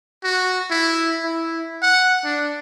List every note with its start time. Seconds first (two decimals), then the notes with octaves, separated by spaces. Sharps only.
0.24 F#4
0.71 E4
1.23 E4
1.82 F#5
2.25 D4